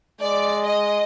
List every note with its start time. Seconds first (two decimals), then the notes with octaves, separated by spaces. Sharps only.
0.21 G#3 D5
0.67 D#5